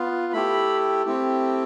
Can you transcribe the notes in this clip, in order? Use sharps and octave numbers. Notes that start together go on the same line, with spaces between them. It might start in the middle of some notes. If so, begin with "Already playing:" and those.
Already playing: B3 F4
A3 E4 G4 B5
A3 C4 E4 G4